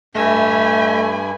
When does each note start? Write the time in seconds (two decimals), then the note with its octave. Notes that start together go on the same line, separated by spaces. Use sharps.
0.15 G2 A3 D#5 E5 G#5 B5